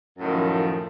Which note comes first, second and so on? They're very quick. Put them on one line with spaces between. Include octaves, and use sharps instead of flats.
F#2 A2 D#3 F3